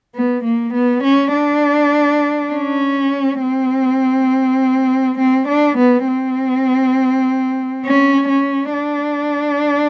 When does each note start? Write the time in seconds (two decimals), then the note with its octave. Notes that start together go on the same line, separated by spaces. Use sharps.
0.15 B3
0.44 A#3
0.74 B3
1.04 C#4
1.33 D4
2.52 C#4
3.41 C4
5.18 C4
5.48 D4
5.77 B3
6.07 C4
7.86 C#4
8.29 C#4
8.73 D4